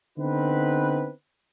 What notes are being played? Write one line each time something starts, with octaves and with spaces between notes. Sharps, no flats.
D3 B3 C4 D#4 B4